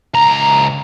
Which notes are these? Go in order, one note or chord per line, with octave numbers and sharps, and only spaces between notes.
C#2 A#5